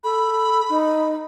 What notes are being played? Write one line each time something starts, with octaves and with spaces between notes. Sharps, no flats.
A4 B5
D#4